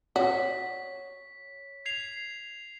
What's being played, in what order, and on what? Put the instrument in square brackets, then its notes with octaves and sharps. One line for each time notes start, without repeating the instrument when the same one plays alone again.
[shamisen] F#4 [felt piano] C#5 [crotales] B6
[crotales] G#6 C7 F7